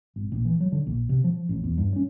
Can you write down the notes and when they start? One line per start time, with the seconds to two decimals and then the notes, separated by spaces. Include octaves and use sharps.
0.16 G#1
0.32 A#1
0.45 E3
0.60 F#3
0.72 D3
0.87 A#1
1.09 C3
1.24 F3
1.49 A1
1.64 E2
1.77 G2
1.96 C#4